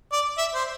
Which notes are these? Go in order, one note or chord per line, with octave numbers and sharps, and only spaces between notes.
D5
E5
C5